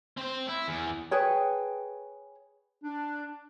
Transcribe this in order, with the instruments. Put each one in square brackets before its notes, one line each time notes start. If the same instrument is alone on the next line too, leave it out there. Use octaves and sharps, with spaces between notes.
[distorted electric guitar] C4 C5
E4
E2
[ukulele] G#4 B4 C#5 G5
[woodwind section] D4